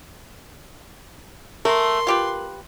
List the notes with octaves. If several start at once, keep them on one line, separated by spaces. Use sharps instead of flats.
A3 A#4 C6
F4 G4 B4